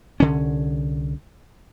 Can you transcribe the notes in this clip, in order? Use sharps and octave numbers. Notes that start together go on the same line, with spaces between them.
C2 D3 C#4